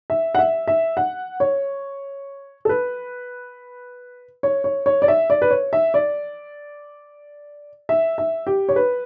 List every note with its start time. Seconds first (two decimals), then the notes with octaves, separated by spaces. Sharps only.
0.10 E5
0.35 F#5
0.39 E5
0.68 E5
0.97 F#5
1.40 C#5
2.65 A4
2.69 B4
4.43 C#5
4.64 C#5
4.86 C#5
5.02 D5
5.08 E5
5.30 D5
5.42 B4
5.51 C#5
5.73 E5
5.94 D5
7.89 E5
8.18 E5
8.47 G4
8.69 C#5
8.76 B4